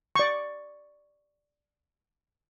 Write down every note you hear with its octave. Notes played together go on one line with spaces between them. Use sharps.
D5 C#6